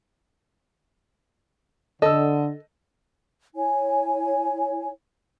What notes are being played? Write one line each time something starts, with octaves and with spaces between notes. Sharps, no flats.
D3 A4 D#5 E6
E4 C#5 G#5